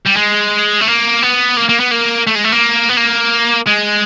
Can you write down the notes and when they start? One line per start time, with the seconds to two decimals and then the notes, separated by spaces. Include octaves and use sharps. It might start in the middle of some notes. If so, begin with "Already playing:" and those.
0.06 G3
0.17 G#3
0.81 A3
0.88 A#3
1.22 B3
1.57 A#3
1.69 A#3
1.80 B3
1.91 A#3
2.27 A3
2.35 G#3
2.44 A3
2.52 A#3
2.89 B3
2.97 A#3
3.67 G#3